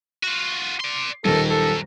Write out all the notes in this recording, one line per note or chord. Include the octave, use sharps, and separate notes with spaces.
F4 F#4
D5 C6
D#1 F#2 D#3 A4 A#4
A4